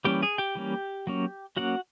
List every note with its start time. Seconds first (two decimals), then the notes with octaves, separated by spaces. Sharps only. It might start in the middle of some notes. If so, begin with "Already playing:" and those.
0.05 E3 G3 A#3 C#4 G4 G5
0.23 G#4 G#5
0.38 G4 G5
0.55 E3 G3 A#3 C#4
1.07 F#3 A#3 C#4
1.56 F#3 A#3 C#4 F#4 F#5